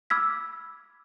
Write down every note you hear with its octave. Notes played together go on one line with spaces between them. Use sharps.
B5 D6 E6 F6 G#6 B6